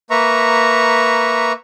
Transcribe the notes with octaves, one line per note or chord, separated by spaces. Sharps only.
A#3 B4 E5 A#5 C#6